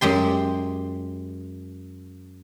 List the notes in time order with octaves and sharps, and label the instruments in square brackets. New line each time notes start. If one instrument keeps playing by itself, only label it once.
[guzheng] F#2 G#3 G4 C6